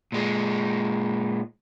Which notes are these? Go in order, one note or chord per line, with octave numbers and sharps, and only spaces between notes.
A#2 G#3